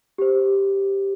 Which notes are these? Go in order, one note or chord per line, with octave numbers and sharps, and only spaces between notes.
G4 C5